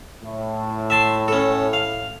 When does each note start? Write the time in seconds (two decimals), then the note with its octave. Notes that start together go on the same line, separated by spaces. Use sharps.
0.23 A2
0.90 E5 A5 C6
1.28 C#4 A4
1.73 F5